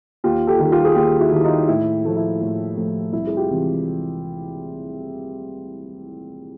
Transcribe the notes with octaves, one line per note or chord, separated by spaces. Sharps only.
D#2 F4 G4
G4 A4
D#3 G3
F4 G4
G#4
D#2 F4 G4
E4 F#4
D#3 G3
D#4 F4
A2 E4
F3 A3
E4
A2
F3 A3
C2 E4
G#4
F4 G4
C3 E3 G#3